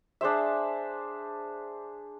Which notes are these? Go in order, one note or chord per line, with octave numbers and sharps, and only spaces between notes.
D4 G#4 C5 E5